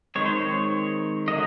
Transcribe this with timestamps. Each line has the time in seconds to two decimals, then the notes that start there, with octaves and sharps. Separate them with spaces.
0.15 D#3 G#3 C4 C#5
0.25 C5
0.36 C#5
1.28 D3 F#3 D#5